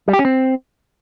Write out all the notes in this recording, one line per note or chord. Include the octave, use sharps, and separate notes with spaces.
G3
G4
C#4
C4